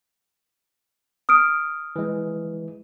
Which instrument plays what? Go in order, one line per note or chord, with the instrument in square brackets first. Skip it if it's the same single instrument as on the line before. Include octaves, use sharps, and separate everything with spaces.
[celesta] D#6 F6 D7
[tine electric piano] E3 G#3